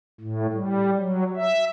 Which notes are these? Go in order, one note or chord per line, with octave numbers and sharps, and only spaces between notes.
A2
G3
F#3
E5